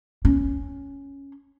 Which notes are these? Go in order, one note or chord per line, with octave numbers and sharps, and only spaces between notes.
C#4